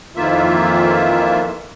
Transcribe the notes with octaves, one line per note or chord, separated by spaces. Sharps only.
F2 D#3 E3 A#3 F4 E5